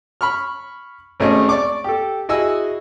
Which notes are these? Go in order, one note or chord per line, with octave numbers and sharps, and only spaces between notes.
B5 C#6 F6
G#1 A3 C#4 D#5
D5 C#6 D6
G4 A4
E4 F#4 G#4 D#5 G#5 E6